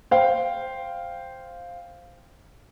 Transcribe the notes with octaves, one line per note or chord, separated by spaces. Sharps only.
C5 F5 G5